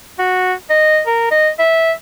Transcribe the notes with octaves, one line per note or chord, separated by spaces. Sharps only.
F#4
D#5
A#4
D#5
E5